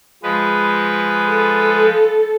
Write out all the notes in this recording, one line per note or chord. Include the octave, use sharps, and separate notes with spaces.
F3 G#3 B4
A4